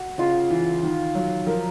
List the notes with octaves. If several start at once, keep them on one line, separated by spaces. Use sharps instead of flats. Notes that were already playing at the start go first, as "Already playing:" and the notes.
Already playing: F#4
C#3 F4
E3
D#3
F#3
F3 A#4